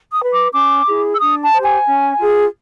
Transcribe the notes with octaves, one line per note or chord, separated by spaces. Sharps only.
D#6
B4
D6
C#4 D6
E4 G#4
E6
D4 D#6
A5
G4 C5
G#5
C#4
F4 G#4